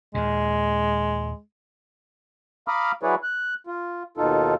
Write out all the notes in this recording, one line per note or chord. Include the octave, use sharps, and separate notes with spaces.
D#2 A#2 G#3
F5 A#5 B5 D6 D#6 F6
F#3 E4 G#4 B4 C#5 D5
F#6
F4
D#2 B2 D#4 F4 A4